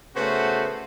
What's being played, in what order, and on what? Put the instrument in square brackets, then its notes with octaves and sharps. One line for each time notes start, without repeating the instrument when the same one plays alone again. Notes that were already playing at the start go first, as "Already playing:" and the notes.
[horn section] C#3 A3 B3 F#4 C5